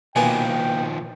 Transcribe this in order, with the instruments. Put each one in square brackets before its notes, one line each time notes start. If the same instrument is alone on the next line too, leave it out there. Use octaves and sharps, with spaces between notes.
[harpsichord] B2 A#3 B3 [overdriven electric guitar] D#3 F3 [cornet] G5 [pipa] G#5